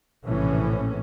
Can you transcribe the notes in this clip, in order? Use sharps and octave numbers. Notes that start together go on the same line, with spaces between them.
A#1 A2 C3 E3 C#4